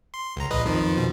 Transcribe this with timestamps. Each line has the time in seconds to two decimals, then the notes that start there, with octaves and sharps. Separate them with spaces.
0.14 C6
0.36 C#2 A#5
0.50 A#1 B4 D#5
0.66 F2 D#3 F3
0.96 B2 F3